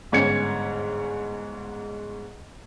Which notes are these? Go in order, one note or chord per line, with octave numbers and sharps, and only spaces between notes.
G1 G#2 C#4 G#6 C#7